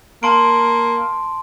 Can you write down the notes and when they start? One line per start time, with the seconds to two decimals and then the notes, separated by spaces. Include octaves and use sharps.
0.23 A#3 A5 C6 D7